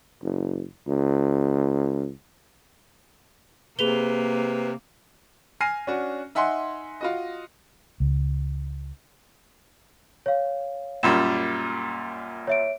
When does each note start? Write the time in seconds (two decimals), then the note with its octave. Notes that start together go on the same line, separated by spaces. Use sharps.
0.23 F#1
0.88 C#2
3.79 C3 A#3 G#4 B4 F7 G7
5.60 G#5 F6 A#6 C7 D#7
5.87 C#4 D4 F#4
6.35 D#4 E5 F#5 G#5 C6
7.01 F4 F#4 D#5
8.00 C#2
10.26 C#5 F5
11.03 F#2 A#2 G3 E7
12.47 C#5 E5 D7